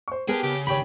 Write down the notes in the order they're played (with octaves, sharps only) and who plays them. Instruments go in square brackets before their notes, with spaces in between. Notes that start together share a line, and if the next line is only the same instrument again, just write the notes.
[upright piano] C5 C#6
[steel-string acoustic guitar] B3 A#4 B4 [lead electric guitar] G4 G5 [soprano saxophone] G#4 [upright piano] A5
[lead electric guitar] C#3 [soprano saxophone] G4
[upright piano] G#1 C#5 [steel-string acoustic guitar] G4 G5 [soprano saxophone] B5